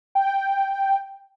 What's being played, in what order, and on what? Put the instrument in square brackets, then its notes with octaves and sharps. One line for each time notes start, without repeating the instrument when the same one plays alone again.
[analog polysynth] G5